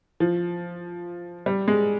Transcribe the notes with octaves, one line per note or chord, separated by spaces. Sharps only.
F3
G3
G#3